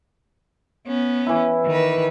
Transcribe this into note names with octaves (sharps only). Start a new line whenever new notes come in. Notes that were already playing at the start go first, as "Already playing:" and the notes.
B3 C#4
E3 E4
D#3 B4